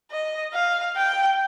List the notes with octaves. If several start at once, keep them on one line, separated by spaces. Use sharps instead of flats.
D#5
F5
G5